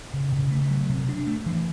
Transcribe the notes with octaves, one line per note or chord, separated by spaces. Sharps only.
C#3
C#3
A3
F#3
C3
D4
A3
E3